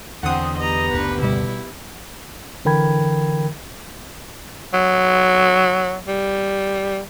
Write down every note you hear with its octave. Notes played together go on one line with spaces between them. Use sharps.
E2 D3 C4 F#5 D#6
B3 G4 D#5 A#5
F#1 D2 D3 B4
B2 G3 E4
D3 E3 A#4 G5 B5 G#6
F#3
G3